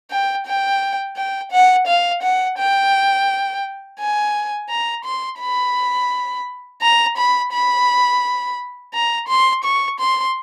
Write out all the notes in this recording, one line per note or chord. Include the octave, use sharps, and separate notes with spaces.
G5
G5
G5
F#5
F5
F#5
G5
G#5
A#5
C6
B5
A#5
B5
B5
A#5
C6
C#6
C6